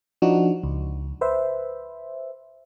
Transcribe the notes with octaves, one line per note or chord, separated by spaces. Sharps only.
F3 D4 D#4 F#4
C#2
B4 C5 E5